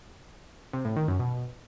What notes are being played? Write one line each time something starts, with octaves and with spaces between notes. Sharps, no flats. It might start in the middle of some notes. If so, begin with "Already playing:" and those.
C3
A2
D#3
F#2
B2